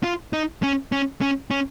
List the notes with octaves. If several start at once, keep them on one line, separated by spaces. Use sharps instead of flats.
F4
D#4
C#4
C#4
C#4
C#4